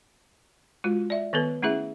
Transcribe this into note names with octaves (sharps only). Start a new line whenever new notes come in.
G#3 F4 F#4
D5 E5
D#3 B3 A4 B4
A3 C#4 E4 G#4 E5